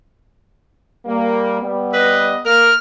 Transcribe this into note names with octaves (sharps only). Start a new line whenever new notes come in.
G3 A#3
G3 B3
B4 D#5
A#3 A#4 F6